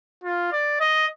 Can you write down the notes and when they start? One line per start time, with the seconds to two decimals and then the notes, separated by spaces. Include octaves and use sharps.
0.24 F4
0.52 D5
0.81 D#5